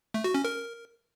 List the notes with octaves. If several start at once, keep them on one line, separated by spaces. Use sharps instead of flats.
A3
F#4
C#4
A#4